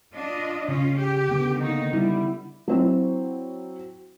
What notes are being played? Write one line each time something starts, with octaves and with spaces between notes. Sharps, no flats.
D4 F4 D#5
C#3 C#4 F4
G4
D3 B3
D#3 A#3 D#4
G3 E4
F#3 C4 E4